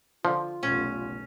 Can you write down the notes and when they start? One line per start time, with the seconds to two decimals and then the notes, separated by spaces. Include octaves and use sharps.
0.25 D3 F3 F4
0.63 F1 B1 C#4